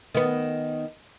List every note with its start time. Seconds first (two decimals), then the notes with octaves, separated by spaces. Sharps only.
0.15 D#3 B3